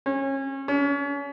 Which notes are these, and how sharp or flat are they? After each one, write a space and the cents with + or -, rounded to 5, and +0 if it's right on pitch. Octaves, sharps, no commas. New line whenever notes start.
C#4 -30
C#4 +35